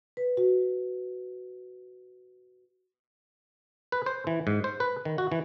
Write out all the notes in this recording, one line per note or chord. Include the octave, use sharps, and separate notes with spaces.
B4
F#4
B4
C5
E3
G#2
C5
B4
D#3
F#4
E3